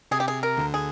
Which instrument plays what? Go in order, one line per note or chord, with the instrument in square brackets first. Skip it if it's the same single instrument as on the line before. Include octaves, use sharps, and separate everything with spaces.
[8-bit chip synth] C3 [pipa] G#4
[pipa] G4
G#4
A#4
[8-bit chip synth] D2 D3
[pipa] G#4